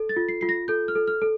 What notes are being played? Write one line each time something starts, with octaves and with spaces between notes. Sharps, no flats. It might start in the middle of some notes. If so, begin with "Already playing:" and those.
Already playing: A4
A6
F4
C7
F4 C7
A#6
A4 G6
F6
A4
F6
A4